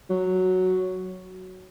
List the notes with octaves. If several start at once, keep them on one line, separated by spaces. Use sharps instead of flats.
F#3